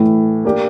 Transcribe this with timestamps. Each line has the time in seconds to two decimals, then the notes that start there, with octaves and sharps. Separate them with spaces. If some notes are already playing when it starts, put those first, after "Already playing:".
Already playing: A2 E3 A3
0.45 A#3 D4 G4